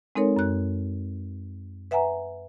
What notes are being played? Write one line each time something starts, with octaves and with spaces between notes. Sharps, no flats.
G#3 C4 D#4 A4 A#4 C#5
F#2 F#6
B4 E5 F#5 G#5 A#5